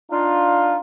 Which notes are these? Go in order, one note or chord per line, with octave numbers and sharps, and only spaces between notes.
D4 D#4 F4